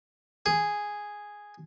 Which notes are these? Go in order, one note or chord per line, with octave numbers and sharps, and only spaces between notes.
G#4